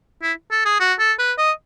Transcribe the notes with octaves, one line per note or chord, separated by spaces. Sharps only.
E4
A4
G#4
F#4
A4
B4
D#5